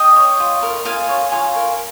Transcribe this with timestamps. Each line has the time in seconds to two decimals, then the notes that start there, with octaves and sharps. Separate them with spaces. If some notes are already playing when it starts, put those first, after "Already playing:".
Already playing: D#5 G5
0.16 C#5
0.40 F4
0.63 A#4
0.85 F4 F5 G#5
1.09 C#5
1.32 F4 F5 G#5
1.56 A#4